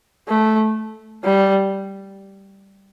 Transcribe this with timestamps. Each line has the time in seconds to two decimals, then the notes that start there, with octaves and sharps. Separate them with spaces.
0.29 A3
1.24 G3